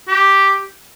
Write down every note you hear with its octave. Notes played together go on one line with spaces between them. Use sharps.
G4